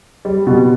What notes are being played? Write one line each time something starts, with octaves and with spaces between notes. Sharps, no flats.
G3
B2